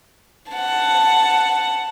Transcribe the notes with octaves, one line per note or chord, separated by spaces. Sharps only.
F#5 A5